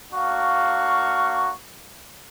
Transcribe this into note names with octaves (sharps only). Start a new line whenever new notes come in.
A#3 D4 F#4 F5 C#6